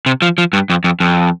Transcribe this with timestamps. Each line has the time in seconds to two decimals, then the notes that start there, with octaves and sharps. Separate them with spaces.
0.06 C3
0.22 F3
0.38 F3
0.53 G2
0.70 F2
0.84 F2
1.00 F2